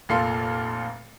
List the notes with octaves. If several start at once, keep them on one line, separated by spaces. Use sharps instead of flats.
F1 A#2 A4 F5 C6